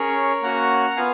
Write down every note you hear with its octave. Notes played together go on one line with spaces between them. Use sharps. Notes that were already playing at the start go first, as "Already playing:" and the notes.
Already playing: C#4 G#4 A#4 C#5
A#3 C#4 F#4 F#5 A#5
B3 F4 F5 G#5